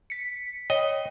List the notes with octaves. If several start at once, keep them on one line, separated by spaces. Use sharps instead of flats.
B6 C#7
C#5 D#5 G5